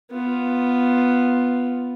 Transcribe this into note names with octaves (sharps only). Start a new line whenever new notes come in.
B3 F4